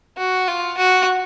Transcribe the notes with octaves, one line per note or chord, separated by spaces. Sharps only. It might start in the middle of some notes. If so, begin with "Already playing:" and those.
F#4
F4
F#4